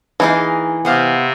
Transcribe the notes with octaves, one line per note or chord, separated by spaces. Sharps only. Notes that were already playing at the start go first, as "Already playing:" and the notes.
E3 A#3 D#4 G#4
C3 B3 C5 F5